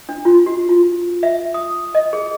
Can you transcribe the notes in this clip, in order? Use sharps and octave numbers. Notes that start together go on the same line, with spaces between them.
D4
F4
F#4
F4
E5
D#6
D#5
G#4